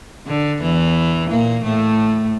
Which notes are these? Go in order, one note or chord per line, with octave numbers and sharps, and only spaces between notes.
D3
E2 E3
A#2 A#3
A2 A3